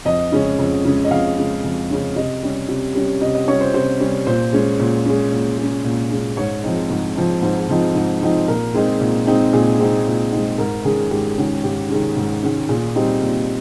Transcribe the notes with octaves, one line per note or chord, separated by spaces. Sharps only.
F2 D#5
C#3 G#3 C#4
F2
C#3 G#3 C#4
D#5
F2 F5
C#3 G#3 C#4
F2
C#3 G#3 C#4
C3 D#5
G3 C#4
C3
G3 C#4
C3 D#5
D#5
G3 C#4 C#5
C5
C3 C5
G3 C#4
A#2 C5
G#3 C#4
A#2
G#3 C#4
A#2
G#3 C#4
A#2
G#3 C#4
G#2 C#5
F3 C4 D#4
G#2
F3 C4 D#4
G#2 C5
F3 C4 D#4
G#2
F3 C4 D#4
A#2 A#4
G#3 C4 D#4
A#2
G#3 C4 D#4
A#2 G#4
G#3 C4 D#4
A#2
G#3 C4 D#4
G#2 A#4
D#3 G#3 C#4 G#4
G#2 G4
D#3 G#3 C#4
G#2 G4
D#3 G#3 C#4
G#2
D#3 G#3 C#4
A#2 G#4
G3 C4 D#4
A#2